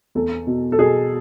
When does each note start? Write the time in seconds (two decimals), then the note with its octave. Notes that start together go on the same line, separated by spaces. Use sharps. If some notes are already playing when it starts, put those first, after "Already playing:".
0.15 E2 A4
0.47 B2
0.72 A4
0.79 B2 G#4